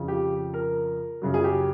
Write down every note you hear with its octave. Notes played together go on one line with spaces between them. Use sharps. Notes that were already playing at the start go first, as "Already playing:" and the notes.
Already playing: F2 C#3 F3
G4
A#4
F#2 C#3 F#3
G#4
G4